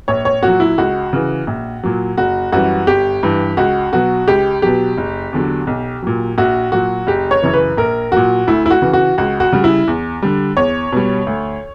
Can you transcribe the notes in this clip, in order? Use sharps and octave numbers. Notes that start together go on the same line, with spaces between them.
A#1 C#5
C#5
A#2 F#3 F#4
E4
C#2 F#4
C#3 E3
A#1
A#2 F#3
F#1 F#4
F#2 E3 G3 F#4
G1 G4
G2 E3
C#2 F#4
B2 F#3 F#4
C#2 G4
B2 F#3 G4
F#1
E2 D3 F#3
B1
A#2 F#3
A#1 F#4
A#2 F#3 F#4
F#1 G4
C#5
F#2 C#3 E3
B4
A#1 A#4
A#2 F#3 F#4
D2 E4
E4
F#4
C#3 E3
F#4
C#2 F#4
F#4
C#3 G3
E4
E2
D3 G3
E2 C#5
B2 G3
D2